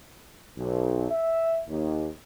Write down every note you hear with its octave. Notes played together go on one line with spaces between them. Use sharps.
B1
E5
D#2